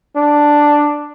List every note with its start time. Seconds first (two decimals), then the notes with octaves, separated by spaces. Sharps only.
0.16 D4